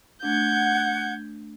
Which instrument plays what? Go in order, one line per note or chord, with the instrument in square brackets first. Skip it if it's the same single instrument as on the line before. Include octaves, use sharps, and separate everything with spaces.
[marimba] A3 D4 [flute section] F#5 [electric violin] G6 G#6